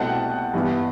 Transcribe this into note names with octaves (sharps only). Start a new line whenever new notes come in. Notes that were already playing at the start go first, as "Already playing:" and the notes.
Already playing: C2 B2 A3 C4 E4 F#5 A5
G2 E3 B3